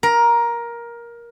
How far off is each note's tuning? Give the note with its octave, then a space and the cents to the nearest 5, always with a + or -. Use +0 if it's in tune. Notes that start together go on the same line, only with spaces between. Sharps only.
A#4 +15